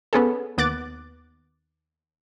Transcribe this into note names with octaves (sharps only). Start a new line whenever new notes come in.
B3 C#4 G#4 A4
D#2 B3 D6 F#6 A6